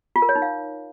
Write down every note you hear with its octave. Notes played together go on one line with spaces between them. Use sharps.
F4
A#4
C#5
D#4
F5